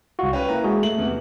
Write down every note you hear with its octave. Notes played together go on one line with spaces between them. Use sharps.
C2 F4 F#4
C#4 B4 G5
A#3 E4 A#5
G#3 F#4 G#4
A3 F#7
E2 C3